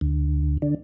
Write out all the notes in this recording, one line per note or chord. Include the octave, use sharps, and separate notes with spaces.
D2
D3